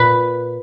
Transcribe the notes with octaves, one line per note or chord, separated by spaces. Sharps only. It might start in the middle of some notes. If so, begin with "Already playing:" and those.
Already playing: A#2 B4